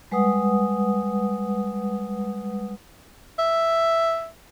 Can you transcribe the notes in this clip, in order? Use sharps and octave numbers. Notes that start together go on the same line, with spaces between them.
G3 G#3 B4 F#5 D#6
E5